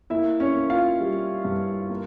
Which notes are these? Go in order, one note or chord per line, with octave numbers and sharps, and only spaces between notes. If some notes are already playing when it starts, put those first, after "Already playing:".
A#3 E4 E5
C#4 C#5
A#3
F4 F5
G3
G2
A#3